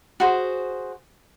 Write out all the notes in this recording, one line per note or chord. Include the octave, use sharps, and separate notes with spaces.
F#4 G#4 C5